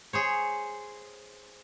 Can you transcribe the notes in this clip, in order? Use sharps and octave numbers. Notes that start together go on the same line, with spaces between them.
G#4 C5 C#5